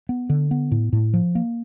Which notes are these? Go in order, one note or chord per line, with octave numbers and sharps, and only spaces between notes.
B3
D3
B3
A2
A2
F3
A#3